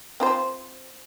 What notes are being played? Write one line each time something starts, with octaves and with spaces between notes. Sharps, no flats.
C4 F4 C5